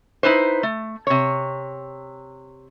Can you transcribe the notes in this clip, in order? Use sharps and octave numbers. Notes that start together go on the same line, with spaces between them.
D#4 E4 B4 C5
A3
C3 C#5